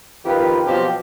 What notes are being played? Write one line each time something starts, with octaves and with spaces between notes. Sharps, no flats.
F2 D#3 F4 G4 B4
B2 F3 F#3 C4 F4 G4